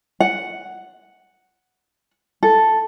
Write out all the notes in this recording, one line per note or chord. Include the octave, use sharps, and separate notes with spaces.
F#5
A4